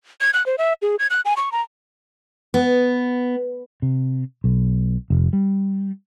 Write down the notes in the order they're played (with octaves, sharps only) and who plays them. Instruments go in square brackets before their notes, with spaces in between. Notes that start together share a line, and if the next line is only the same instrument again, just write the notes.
[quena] G#6
F#6
C5
E5
G#4
G#6
F#6
G#5
C#6
A#5
[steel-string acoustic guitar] B3
[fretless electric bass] C3
B1
F1
G3